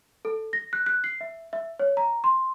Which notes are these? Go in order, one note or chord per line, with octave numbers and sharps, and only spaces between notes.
A4
A#6
F#6
F#6
C7
E5
E5
C#5
A#5
C6